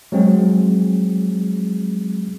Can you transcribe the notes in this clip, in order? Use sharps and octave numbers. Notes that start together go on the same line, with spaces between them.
F#3 G#3 C4 G#4